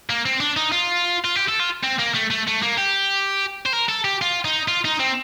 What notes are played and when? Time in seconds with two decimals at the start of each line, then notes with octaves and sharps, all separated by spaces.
0.10 A#3
0.25 C4
0.40 D4
0.57 D#4
0.72 F4
1.24 F4
1.35 G4
1.48 A4
1.60 F4
1.84 C4
1.99 A#3
2.14 A3
2.30 A3
2.47 A3
2.63 A#3
2.78 G4
3.66 C5
3.73 A#4
3.89 A4
4.05 G4
4.22 F4
4.45 D#4
4.68 F4
4.85 D#4
5.00 C4